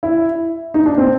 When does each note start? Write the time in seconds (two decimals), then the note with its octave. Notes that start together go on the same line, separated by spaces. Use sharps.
0.03 E4
0.74 D#4
0.86 D4
0.98 C4